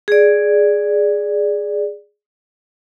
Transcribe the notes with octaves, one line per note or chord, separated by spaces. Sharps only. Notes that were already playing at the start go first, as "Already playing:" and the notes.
G#4 D5